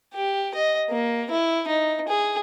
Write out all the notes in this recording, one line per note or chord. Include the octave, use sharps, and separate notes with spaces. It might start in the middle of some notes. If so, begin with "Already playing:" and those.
G4
D#5
A#3
E4
D#4
G#4